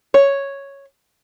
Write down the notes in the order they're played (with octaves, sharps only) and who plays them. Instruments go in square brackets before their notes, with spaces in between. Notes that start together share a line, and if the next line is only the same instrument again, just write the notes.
[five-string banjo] C#5